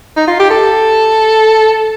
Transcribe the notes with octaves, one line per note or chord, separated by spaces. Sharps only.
D#4
F4
G4
A4